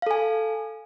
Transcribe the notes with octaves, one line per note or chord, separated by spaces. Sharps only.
A4 F5 G#5